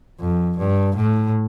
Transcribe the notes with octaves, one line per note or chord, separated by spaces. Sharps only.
F2
G2
A2